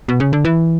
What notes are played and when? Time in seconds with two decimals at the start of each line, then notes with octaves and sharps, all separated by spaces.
0.08 B2
0.20 C#3
0.33 D3
0.45 E3